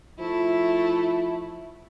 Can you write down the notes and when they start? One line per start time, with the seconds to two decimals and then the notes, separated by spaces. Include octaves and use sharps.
0.19 F3 A3 E4